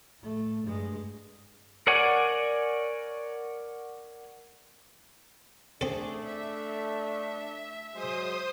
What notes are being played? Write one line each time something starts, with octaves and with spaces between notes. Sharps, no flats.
A2 A3
G2 G#3
A#4 C#5 D5 F#5 G#5
A3 C4 D4 G#4 A4
E5
F#3 G#3 C5 D#6